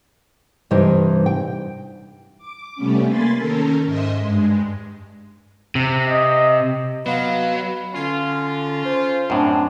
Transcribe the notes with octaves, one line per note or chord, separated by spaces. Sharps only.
G2 C3 E3 D#4 G4 D#5
G5
D6
C3 G3 A3 B3 C#4
A#3 G#5 B5 C6 A6
D#3 C#4 A4 A#4
G#2 D#5 E5 C6
G2 G#3
C3
D#5
F#3 B3 B4 D#5 F5 C6
D3 C#4 F4
C5
F#2 A2 C4 D4